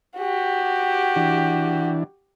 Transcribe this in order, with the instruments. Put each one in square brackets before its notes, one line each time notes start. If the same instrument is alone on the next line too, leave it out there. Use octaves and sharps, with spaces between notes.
[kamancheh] F#4 G4
[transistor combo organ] E3 D4